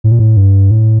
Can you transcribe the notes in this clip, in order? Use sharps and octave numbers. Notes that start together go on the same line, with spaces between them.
A2
A#2
A2
G2
A2